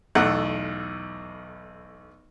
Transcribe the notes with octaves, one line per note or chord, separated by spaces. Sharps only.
B1 E2 A3 F#5